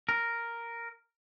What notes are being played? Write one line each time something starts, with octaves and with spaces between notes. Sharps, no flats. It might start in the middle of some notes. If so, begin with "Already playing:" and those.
A#4